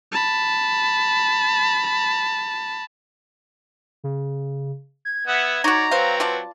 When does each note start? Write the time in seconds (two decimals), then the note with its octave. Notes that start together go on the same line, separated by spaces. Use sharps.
0.12 A5 B5
4.04 C#3
5.05 G#6
5.27 B3 E5 F#5
5.64 D#4 F#4 C#5 D5 A#5
5.91 F#3 C4 B4 C5 F5
6.20 F4 D5 A5